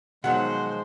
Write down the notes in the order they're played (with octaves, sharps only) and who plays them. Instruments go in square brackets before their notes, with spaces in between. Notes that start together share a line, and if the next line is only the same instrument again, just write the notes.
[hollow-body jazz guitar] B2 D#3 F#3 [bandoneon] F3 G#3 [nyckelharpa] C5 [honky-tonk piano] F#5